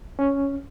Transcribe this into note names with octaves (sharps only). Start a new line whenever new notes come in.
C#4